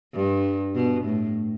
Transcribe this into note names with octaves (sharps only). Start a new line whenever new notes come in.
G2
B2
A2